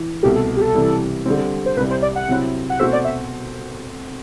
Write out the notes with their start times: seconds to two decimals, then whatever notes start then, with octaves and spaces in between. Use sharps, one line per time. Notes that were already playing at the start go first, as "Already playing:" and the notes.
Already playing: E3
0.23 C2 B2 A3 G4
0.35 A4
0.57 G4
0.62 A4
0.74 C3 E3 G3
1.26 D3 G3 C4
1.66 C5
1.77 C2 C3 G3 B4
1.90 C5
2.02 D5
2.16 F#5
2.28 C3 F#3 C4 E4
2.70 F#5
2.80 B2 A3 C4 F#4 C5 E5
2.93 D5
3.05 E5